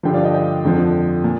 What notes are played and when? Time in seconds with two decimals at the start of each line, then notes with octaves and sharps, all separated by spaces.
0.03 G2 D3 F3 G5
0.14 D5 F5
0.24 D#5 G5
0.34 D#5 G5
0.64 F2 D3 F3
1.24 A#2